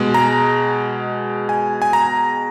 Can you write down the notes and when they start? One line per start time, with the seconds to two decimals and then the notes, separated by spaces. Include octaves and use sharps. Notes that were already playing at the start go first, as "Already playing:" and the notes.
Already playing: B2 G#3
0.14 A#5
1.49 G#5
1.82 G#5
1.93 A#5